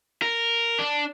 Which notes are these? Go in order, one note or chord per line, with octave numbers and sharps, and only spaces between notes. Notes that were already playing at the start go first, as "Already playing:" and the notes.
A#4
D4